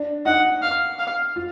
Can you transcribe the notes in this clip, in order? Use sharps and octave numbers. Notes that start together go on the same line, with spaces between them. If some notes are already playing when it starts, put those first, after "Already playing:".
Already playing: D4
D#4 F#5
F5
F5
F4